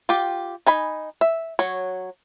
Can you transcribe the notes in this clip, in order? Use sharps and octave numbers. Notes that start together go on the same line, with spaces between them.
F4 G4
D#4 G#5 B5
E5
F#3 C#5